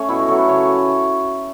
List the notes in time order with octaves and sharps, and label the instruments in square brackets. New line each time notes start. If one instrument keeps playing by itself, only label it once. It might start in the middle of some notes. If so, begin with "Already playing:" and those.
Already playing: [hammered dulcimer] A3 C#4
B2 E4
F#4
F#3 A3 A4
B4
C#3 C#5